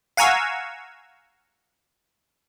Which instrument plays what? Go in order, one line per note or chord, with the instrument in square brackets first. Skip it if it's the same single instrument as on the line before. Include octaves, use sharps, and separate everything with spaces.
[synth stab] F5 F#5 G#5 A#5 C#6 E6